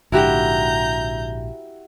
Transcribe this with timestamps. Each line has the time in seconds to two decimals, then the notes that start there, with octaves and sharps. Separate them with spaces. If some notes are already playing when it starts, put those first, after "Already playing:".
0.12 A#1 G#2 D3 E4 F#4 G4 A#5 G6